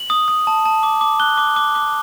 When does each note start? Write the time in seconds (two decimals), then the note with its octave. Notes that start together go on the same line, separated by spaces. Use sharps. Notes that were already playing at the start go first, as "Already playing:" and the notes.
Already playing: F#7
0.10 D#6
0.28 D#6
0.47 A5
0.65 A5
0.83 D6
1.01 D6
1.20 F#6 G7
1.38 D6
1.56 D6
1.75 D6